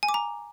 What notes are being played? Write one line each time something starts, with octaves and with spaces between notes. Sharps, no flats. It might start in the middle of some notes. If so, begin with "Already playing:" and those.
G#5
D6
A#5